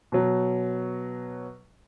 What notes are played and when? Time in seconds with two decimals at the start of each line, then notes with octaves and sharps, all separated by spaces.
0.12 B2 F#3